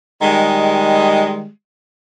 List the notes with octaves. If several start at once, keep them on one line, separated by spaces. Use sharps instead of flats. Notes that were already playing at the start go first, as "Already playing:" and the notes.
D#3 G3 G#3